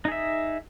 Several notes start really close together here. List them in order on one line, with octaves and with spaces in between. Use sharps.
D#4 G#4 E5